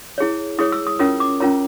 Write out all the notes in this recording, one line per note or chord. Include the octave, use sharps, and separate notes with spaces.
E4 G#4 C#5
E4 G#4 C#5 D#6
E6
D#6
C#4 F4 A#4 C#5 D#6
D6
C#4 F4 A#4 C#5 A#5